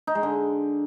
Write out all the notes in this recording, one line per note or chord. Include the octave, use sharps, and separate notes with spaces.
D#4
G#3
D3